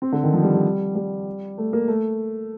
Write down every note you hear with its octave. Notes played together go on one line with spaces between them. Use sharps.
C4
D3
D#3
F3
G3
G3
G3
A3
A#3
A3